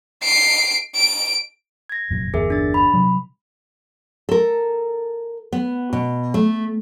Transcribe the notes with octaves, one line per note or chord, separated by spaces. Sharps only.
C7 D7
D7
G#6 A#6
F1 F#2 A#2
G1 E2 G#4 A#4 E5
D4 A6
B5
C3 F#3 G3
A4 A#4
B3
B2
A3